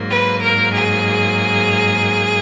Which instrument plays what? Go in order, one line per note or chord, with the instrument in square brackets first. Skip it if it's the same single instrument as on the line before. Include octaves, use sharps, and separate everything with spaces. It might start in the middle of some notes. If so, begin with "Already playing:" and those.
Already playing: [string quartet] G#2 F#3 A#3
B4
A#4
G#4